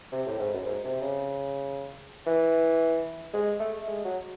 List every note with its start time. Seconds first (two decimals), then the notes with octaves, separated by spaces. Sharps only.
0.12 C3
0.26 A2
0.39 G#2
0.53 F#2
0.66 G#2
0.84 C3
1.01 C#3
2.26 E3
3.33 G#3
3.60 A3
3.87 G#3
4.04 F#3